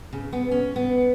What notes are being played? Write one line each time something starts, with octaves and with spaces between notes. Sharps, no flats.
C#3
B3
C#4
B3